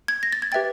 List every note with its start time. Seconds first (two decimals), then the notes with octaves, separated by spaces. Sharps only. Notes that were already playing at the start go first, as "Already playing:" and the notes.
0.08 G#6
0.23 A#6
0.33 A6
0.42 G#6
0.52 G4 B4 E5 G5 A6